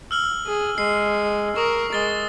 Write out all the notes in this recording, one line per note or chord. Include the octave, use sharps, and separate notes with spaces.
E6 F6 F#7
G#4
G#3 C7
A#4 C#6 D#6
G#3 A6 G7